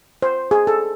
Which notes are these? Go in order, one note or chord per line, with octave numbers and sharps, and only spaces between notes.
C5
G#4
A4